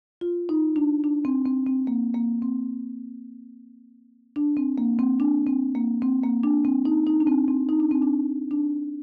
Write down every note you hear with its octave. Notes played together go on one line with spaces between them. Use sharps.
F4
D#4
D4
D4
C4
C4
C4
A#3
A#3
C4
D4
C4
A#3
C4
D4
C4
A#3
C4
A#3
D4
C4
D#4
D#4
D4
C4
C4
D#4
D4
C4
D4
D4